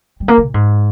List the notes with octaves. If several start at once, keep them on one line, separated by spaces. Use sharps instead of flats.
G3
A#3
E3
A#2
G#2